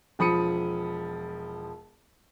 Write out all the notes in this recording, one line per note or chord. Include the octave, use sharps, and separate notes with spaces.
E1 F3 B5 D#6 C#7 D#7